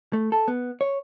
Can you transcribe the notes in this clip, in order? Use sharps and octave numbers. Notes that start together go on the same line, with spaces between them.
A3
A4
B3
C#5